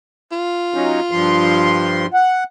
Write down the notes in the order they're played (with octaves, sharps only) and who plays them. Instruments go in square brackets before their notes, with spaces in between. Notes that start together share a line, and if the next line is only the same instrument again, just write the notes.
[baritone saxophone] F4
[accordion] F#3 C#4 D#4
G2 F3 C6
[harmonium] F#5